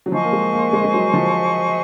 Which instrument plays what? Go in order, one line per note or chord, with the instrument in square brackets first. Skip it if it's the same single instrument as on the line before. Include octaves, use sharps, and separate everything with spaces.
[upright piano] F#3
[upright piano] F3 [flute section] C5 D#5 G#5 C#6
[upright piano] A#3
G#3
A#3
G#3
G#3
F#3
F3